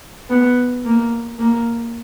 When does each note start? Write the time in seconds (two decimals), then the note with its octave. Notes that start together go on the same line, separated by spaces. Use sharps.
0.29 B3
0.85 A#3
1.39 A#3